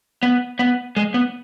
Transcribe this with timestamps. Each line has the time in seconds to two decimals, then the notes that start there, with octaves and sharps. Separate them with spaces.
0.23 B3
0.59 B3
0.96 G#3
1.14 B3